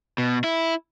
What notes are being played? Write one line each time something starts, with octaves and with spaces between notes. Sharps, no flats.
B2
E4